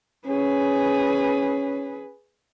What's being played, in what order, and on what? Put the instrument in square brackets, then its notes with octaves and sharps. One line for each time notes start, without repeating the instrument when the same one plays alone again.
[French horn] C#4 [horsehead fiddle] G#4 B4